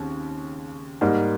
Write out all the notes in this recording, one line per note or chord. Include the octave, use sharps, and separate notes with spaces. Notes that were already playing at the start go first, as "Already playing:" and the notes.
Already playing: D#2 C#3 C4
G#2 G3 A#3 D#4